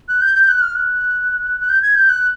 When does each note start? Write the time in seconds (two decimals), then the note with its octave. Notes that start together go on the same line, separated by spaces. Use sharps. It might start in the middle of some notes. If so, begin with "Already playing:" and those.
0.09 F#6
0.22 G6
0.35 G6
0.49 F#6
0.62 F6
0.75 F#6
1.60 F#6
1.69 G6
1.82 G#6
1.96 G6
2.09 F#6